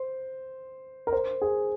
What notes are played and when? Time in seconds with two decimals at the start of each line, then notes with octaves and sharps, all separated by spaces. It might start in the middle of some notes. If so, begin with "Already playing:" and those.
Already playing: C5
1.07 A#4
1.13 C5
1.42 G#4